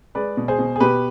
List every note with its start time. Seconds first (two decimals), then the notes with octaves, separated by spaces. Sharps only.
0.15 G#3 B4 D5
0.37 B2
0.48 G#4 C5
0.59 B2
0.76 G#4
0.80 B2 G4 B4